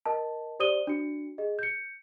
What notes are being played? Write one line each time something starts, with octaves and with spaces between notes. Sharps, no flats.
A#4 D#5 A5
G4 C5 D5 D#6 D#7 G7
D4 F#4 C#7
G#4 D#5
G6 C#7